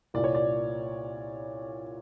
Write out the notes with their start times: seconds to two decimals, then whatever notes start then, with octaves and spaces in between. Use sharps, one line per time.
0.14 C2 A#2 D5
0.24 C#5
0.35 D5